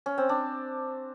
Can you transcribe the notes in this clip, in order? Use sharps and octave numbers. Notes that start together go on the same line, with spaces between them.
C#4
C4
D4